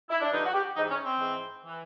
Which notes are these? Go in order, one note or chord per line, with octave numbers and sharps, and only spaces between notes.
E4
D4
G2 D3 F3 D#4
F#4
G4
G#2 E3 D#4
C#4
C4
G#2 E3
E3